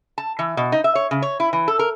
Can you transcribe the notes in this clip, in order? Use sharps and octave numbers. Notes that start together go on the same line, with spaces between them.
A5
E3
B2
D#4
E5
C#5
C#3
C#5
E4
E3
A4
A#4